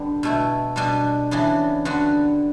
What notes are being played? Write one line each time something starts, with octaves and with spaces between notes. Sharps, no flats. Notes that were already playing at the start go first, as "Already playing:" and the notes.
Already playing: D3 G3 B3
B2 A3 E4
B2 G3 D4 F#4
C#3 E3 B3 D4
D3 G3 B3 D4 F#4